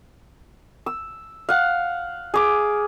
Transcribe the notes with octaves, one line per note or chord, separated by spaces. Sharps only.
E6
F5 F#5
G#4 D6